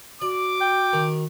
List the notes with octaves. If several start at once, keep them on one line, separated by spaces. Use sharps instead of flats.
F#4 D5 D6
G5
D#3